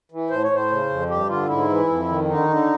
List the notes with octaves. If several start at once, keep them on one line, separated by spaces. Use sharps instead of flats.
E3
A2 C5
C#5
A2 C5
C#3
F2
G2 G4
D3 F4
G#2 E4
E3
F2
D#3
D3 D#4
D3